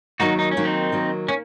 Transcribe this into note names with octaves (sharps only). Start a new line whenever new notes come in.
D#3 F#3 A#3 D#4 F#4
D#4
C#4
D#3 F#3 A#3
C4 D#4
D#3 F#3 A#3
A#3 C#4